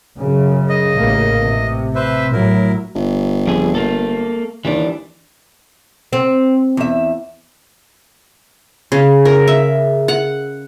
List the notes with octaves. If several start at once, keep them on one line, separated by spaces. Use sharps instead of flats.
F#2 C#3
D#5
A1 C#3 A#3
C3
B4 C5 E5
A2 F#3 E4 A#4
G1
F2 G#4
A#3 A4
D#2 E3 D4
C4
E2 E5
C#3
A#4
E5
F#5